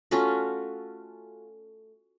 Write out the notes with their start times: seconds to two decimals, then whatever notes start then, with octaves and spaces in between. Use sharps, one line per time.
0.11 A3 C#4 F4 F#4